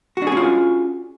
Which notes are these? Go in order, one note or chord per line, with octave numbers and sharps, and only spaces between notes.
C#4 D4 F4 F#4 G#4